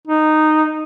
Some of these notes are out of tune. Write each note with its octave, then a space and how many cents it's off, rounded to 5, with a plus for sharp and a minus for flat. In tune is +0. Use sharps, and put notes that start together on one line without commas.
D#4 -10